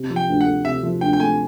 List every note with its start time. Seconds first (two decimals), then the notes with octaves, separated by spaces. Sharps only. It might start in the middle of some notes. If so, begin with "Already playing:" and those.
Already playing: C3
0.10 F3
0.16 G5
0.29 D2
0.41 F#5
0.46 A3
0.65 C3 E5
0.83 F3
1.01 D2 G5
1.13 G5
1.20 A3 G#5